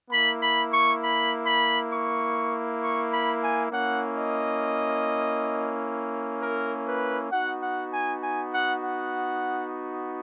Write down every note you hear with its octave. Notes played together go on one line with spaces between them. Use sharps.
A#3 E4 B5
B5
C#6
B5
B5
C#6
C#6
B5
G#5
A#3 C#4 E4 F#5
D#5
A#4
B4
B3 D#4 F#4 F#5
F#5
G#5
G#5
F#5
F#5